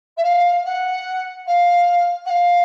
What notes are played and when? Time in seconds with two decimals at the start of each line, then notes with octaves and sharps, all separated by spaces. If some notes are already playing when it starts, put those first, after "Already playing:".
0.17 E5
0.23 F5
0.65 F#5
1.47 F5
2.25 F#5
2.29 F5